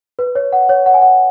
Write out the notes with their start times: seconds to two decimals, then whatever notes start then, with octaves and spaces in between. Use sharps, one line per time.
0.19 B4
0.35 C#5
0.53 F#5
0.69 C#5
0.86 F#5
0.94 G#5
1.02 F#5